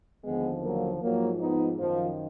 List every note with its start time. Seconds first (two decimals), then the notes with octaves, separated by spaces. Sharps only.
0.24 D#2 D3 F3 G#3 B3
0.62 F#3 A#3
1.01 G#2 F3 F#3 A#3
1.40 B3 D#4
1.79 F#2 D#3 F3